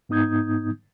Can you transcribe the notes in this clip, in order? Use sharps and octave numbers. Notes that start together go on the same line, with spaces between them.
G#2 B3 D#4 D#6 G6 G#6